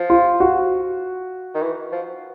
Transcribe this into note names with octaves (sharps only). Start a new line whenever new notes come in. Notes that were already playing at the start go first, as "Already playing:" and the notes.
Already playing: F3
F4
F#4
D#3
E3
F3